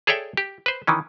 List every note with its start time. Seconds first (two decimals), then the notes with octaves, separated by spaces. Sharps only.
0.07 G#4 A4 C#5 D5 E5 G5
0.37 G4
0.66 B4 C5
0.87 D#3 E3 C#4